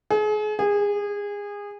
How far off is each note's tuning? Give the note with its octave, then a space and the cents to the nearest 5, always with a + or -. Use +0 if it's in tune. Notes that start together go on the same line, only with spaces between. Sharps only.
G#4 +35
G#4 -25